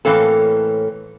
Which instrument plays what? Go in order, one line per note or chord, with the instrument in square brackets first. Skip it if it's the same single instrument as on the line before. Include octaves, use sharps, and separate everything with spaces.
[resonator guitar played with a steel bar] A2 E3 A#3 C4 C#4 A4